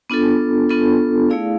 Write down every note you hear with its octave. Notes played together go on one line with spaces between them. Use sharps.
B3 D4 F4 A4
B3 D4 F4 A4
A3 E4 G#4 D5 F5